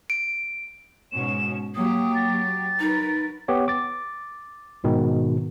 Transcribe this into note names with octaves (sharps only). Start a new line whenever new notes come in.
D7
G#2 B2 C#4 E7
F#3 A#3 G4 D#6
A6
F#3 D#4 A#4 B4
B3 G4 C#5
D6 A6
G#2 B2 D#3